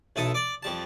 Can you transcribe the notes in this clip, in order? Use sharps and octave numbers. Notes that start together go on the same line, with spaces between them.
B1 E4 A4 D#6
D5 D6
F2 G3 A5